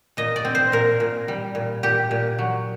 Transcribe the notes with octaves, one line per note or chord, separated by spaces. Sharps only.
A#2 D#5
D5
C4
C5
A#2 A#4
A#2
G3
A#2
A#2 G4
A#2
F#3